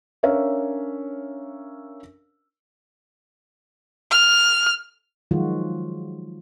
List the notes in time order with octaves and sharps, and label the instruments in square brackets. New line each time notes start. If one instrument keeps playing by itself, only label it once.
[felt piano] C#4 D4 A#4 C#5 E5 F5
[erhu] F6
[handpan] D#3 F3 F#3 G#3 F4 F#4